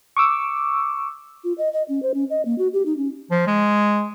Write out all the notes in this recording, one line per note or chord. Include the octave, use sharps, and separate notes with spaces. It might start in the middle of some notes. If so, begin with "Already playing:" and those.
C#6 D6 E6
F4
D#5
D#5
C#4
C5
C#4
D#5
A#3
F#4
G4
D#4
C#4
F3
G#3